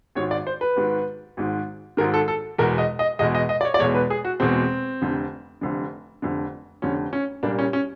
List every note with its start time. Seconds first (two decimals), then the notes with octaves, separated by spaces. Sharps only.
0.15 G#1 G#2 D#3 C#5
0.31 D5
0.47 C5
0.61 B4
0.76 G#1 G#2 D#3
1.37 G#1 G#2 D#3
1.97 G#1 G#2 D#3 A#4
2.14 A4
2.28 A4
2.58 E2 B2 G#3 A#4
2.78 D#5
2.99 D#5
3.19 E2 B2 G#3 D#5
3.35 D#5
3.49 D#5
3.61 D5
3.65 C#5
3.74 D5
3.79 E2 B2 G#3 C#5
3.95 B4
4.10 G#4
4.25 F#4
4.40 E2 B2 G#3 C4
5.02 F1 F2 D3
5.61 F1 F2 D3
6.22 F1 F2 D3
6.82 F1 F2 D3 C#4
7.13 C#4
7.43 C2 A#2 G3 A#3 D4
7.59 C#4
7.73 C#4